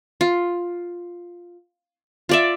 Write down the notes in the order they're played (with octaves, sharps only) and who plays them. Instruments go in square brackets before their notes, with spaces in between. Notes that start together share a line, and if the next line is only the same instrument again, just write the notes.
[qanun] F4
F4 D5 E5